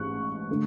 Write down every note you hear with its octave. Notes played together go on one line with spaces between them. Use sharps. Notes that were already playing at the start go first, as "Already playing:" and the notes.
Already playing: A1 G#2 C#6 F#6
D3 A3